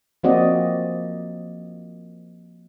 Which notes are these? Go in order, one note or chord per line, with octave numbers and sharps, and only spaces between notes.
F3 A#3 C4 F#4 D5 D#5